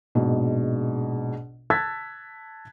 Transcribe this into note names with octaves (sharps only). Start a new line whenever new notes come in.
A#1 G#2 B2
A5 E6 F#6 G#6 A6 B6